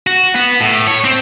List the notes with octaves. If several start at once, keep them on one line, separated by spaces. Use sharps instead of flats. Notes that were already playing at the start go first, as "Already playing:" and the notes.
F#4
B3
A2
C#5
C4